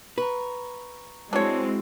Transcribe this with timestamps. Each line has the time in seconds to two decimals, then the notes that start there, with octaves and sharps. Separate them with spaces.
0.18 B4 A#5 C#6
1.33 G#3 C4 D4 E4 F#4 C#5 E6